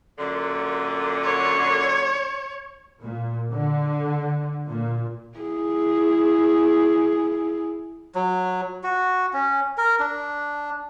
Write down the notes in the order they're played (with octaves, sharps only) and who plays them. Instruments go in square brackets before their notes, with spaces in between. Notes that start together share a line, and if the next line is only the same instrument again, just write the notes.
[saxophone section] F#2 A#2 D3
[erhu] C#5
[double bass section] A#2
D3
A#2
[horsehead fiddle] E4 G#4
[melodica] F#3
F#4
C#4
A#4
D4